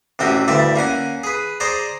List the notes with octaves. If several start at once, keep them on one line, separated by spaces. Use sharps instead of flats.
A1 C3 C#4 F#4 G5
D2 G2 E4 D5
A#3 C#4 F#5 G#5
G#4 B4
G#4 C5 D5 G#5 A#5